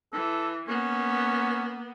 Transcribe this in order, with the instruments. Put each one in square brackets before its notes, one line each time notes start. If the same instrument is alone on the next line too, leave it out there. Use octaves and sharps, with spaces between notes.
[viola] E3 [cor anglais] A4
[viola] A#3 B3 [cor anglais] C#4